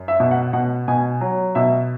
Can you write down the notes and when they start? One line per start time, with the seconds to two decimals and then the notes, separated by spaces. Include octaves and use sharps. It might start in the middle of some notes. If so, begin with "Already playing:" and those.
Already playing: F#2
0.08 E5
0.20 B2
0.31 F#5
0.53 B2 F#5
0.88 B2 G#5
1.21 F#3
1.55 B2 E5